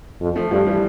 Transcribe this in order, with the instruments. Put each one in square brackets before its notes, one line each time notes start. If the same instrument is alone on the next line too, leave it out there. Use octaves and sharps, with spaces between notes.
[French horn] F2
[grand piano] F3 A3
[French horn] G2 [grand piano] F3 A3
[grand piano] E3 G3